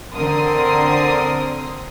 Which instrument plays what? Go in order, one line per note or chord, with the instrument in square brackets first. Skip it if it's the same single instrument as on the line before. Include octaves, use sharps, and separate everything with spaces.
[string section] D3 C4 A#4 C6 D#6